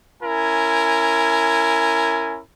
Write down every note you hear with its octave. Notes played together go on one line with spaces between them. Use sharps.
C#4 E4 A#4 G#5